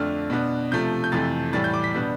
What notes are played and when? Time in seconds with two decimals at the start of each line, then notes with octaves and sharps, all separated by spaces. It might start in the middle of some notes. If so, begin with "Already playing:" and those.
Already playing: F2 D3 A3 D4 F6
0.30 B2 B3 D4
0.71 C3 F3 A3 G6
1.04 G6
1.12 F2 C3 E3 A3 A6
1.53 A2 E3 G3 A6
1.64 G6
1.74 D6
1.84 B6
1.94 B2 G3 B3 D4